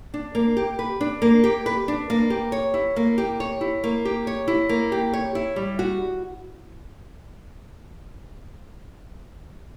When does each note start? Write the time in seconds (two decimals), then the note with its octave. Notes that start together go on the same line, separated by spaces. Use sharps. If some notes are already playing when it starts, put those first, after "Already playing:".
0.14 D4
0.35 A#3
0.57 G4
0.79 B4
1.01 D4
1.22 A#3
1.44 G4
1.66 B4
1.88 D4
2.10 A#3
2.30 G4
2.52 C#5
2.74 E4
2.96 A#3
3.18 G4
3.40 C#5
3.61 E4
3.84 A#3
4.05 G4
4.27 C#5
4.48 E4
4.69 A#3
4.92 G4
5.13 C#5
5.35 E4
5.56 G3
5.79 F#4